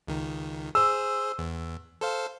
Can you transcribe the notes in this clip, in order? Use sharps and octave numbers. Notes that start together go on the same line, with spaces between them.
C#2 D#3
G#4 C5 E6
E2
A4 C5 F5